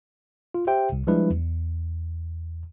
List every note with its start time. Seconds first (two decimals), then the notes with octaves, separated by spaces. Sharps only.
0.54 F4
0.67 G4 C5 E5 G5
0.92 C2
1.07 F3 G3 G#3 D4 E4 B4
1.30 E2